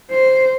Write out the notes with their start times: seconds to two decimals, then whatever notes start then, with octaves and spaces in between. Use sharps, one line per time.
0.11 C5